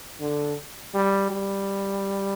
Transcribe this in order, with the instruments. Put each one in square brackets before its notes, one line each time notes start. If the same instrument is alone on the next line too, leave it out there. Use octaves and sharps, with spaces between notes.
[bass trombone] D3
G3
G3